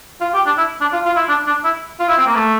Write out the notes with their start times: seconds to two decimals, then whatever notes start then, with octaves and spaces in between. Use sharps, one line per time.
0.21 F4
0.34 G4
0.46 D4
0.58 E4
0.81 D4
0.93 F4
1.05 F4
1.16 E4
1.29 D4
1.46 D4
1.64 E4
2.00 F4
2.09 E4
2.18 C4
2.27 A#3
2.35 A3